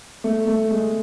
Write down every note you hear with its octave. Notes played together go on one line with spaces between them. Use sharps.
A3
A3
G#3